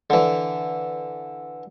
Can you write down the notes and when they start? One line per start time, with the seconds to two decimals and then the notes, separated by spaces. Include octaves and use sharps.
0.10 D3 E3